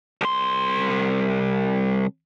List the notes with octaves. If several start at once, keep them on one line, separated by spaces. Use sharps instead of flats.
C2 C6